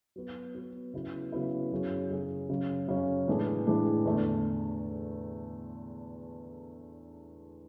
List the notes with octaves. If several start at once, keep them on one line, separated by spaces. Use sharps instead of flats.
F#3 B3 F#4
F#3 B3 F#4
C#3 F#3 B3 E4
C#3 F#3 B3 E4
F#2 C#3 F#3 C#4 G#4
F#2 C#3 F#3 C#4 G#4
F#2 C#3 F#3 C#4
F#2 C#3 F#3 C#4
A2 E3 G#3 D4 G#4
A2 E3 G#3 D4 G#4
E2 D3 A3